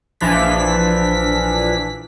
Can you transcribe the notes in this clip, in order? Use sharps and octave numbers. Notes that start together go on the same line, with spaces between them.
A#1 E3 F3 D4 B6